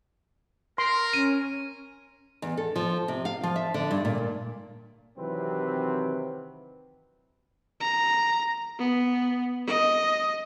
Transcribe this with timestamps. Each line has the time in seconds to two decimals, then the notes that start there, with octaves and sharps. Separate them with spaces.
0.78 A#4 C6
1.13 C#4 D#7
2.42 E2
2.57 A4
2.76 F3
3.08 C3
3.25 F5
3.43 F3
3.56 E5
3.74 D3
3.91 G2
4.05 A#2
5.18 C3 D#3 E3 F#3 C4 B4
7.80 A#5
8.79 B3
9.67 D#5